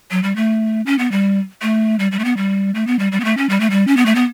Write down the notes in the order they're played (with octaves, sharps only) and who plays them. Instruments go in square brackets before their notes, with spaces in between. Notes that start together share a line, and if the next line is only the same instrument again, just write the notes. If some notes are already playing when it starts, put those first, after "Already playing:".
[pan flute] F#3
G3
A3
C#4
B3
G3
A3
G3
G3
A3
B3
G3
A3
B3
G3
G3
B3
A3
C#4
G3
A3
G3
C#4
B3
A3
B3